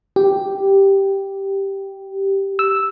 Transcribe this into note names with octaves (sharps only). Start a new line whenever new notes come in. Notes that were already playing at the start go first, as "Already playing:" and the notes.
G4
E6